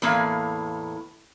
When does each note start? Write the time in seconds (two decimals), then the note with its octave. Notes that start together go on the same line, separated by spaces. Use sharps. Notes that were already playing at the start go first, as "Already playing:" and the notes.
0.02 E2 A2 A#3 F5